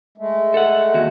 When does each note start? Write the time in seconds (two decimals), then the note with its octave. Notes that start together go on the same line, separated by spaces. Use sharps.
0.18 G#3 A3
0.54 A4 F#5
0.94 D#2 F#4